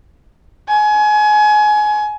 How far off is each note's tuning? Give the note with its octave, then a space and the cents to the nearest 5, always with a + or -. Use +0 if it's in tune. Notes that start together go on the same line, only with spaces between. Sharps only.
G#5 +25